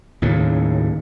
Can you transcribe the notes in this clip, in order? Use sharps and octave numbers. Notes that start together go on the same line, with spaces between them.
D#2 A2 C#3